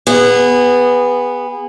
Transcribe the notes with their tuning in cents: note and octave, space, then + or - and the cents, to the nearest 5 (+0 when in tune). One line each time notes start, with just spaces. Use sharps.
B3 +0 G#4 -25